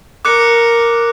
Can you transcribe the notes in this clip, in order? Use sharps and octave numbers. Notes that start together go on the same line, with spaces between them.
A#4 D6 F#6 C#7